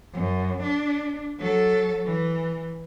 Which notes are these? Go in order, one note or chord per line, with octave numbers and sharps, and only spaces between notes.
F#2
D4
F#3 A4
E3